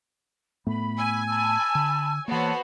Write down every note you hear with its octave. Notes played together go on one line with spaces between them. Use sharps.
A2 A3 B3 B5
G#5 E6
A5 B5 E6
D3
E3 A#3 B3 F#4 A4 C5 C#5